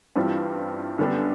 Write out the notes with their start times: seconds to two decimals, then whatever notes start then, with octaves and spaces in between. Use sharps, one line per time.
0.16 G2 E3 G3 C4 F4
0.98 F#2 D3 G3 B3 D4